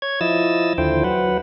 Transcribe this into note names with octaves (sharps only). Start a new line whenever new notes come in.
C#5 G#6
F3 E4 D#5 E6 A6
D#2 D3 F3 E4 C5 G5
F#3 B4 F#5